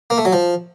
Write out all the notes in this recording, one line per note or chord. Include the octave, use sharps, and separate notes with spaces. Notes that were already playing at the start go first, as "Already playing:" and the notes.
A#3
A3
F#3
F3